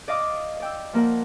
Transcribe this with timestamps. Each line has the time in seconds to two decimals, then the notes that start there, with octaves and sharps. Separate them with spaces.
0.08 D5 D#5 F5 D6 D#6
0.60 D5 G5 E6
0.93 F3 A#3 A#4 F#5